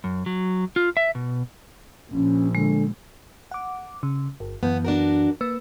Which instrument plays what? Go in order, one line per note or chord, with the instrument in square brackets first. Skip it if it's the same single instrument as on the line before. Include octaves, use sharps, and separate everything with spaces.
[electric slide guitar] F#2
F#3
F4
E5
B2
[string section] A#1 [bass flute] C#4
[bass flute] D3 [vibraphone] G#3
[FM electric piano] F#5 D6
C#3
G1
[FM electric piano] F#2 E3 [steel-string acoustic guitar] B3
[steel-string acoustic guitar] D4 F#4 A#4
[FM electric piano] A#3 B4 E6